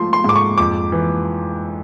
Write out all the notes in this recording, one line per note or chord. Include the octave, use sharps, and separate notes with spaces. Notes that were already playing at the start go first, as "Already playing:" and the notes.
Already playing: G#2 F3 A3 C6
C6
G#2 D6
C#6
F2 D6
E3